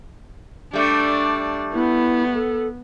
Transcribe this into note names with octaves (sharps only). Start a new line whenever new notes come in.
G3 A3 D4
B3 E4
A4